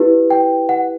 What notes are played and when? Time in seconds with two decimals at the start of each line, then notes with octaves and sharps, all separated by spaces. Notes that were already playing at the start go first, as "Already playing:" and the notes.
Already playing: E4 G4 B4
0.30 G5
0.69 F#5